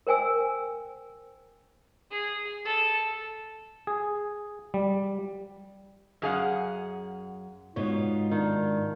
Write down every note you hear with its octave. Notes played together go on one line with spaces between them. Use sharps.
A#4 C5 G5 G#5 E6
G#4
A4
G#4
G3
F#2 G#4 F5 F#5
G#2 B2 B3 D#4 F4 C#5
D#3 D4